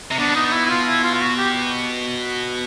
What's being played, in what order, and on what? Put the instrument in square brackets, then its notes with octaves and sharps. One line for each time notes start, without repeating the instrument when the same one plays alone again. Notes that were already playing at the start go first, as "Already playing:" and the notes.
[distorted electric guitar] C3
[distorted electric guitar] B2 [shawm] D4
[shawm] D#4
D#4
E4
E4
F4
E4
F4
F4
F#4
G4